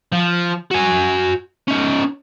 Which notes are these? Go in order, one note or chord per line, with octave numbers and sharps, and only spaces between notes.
F3
F#4 G#5
C#4 D#4